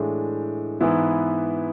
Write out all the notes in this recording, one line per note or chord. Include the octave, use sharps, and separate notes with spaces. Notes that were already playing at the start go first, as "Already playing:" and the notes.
Already playing: A2 E3 G#3 D4
G#2 E3 B3 E4